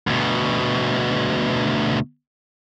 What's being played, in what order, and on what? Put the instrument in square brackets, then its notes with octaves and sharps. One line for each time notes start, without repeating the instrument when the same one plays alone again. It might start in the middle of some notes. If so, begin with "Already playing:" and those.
[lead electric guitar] D2 B2